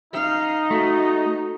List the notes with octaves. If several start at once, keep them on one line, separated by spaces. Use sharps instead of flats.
D#4 F5
A3 F#4